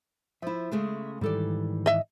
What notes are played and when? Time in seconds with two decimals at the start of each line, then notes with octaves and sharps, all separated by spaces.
0.42 F3 E4 E5
0.72 C#3 G#3 A3
1.21 G#2 D#3 E3 G3 A4 D5
1.86 D#5 E5